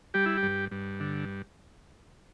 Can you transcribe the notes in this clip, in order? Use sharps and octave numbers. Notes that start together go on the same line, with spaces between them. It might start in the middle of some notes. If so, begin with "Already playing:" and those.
G3 G4
E4
G4
G2
G2
D3